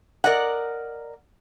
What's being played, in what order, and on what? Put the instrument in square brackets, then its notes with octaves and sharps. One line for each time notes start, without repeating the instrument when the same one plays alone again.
[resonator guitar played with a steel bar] A#4 D5 D#5 F#5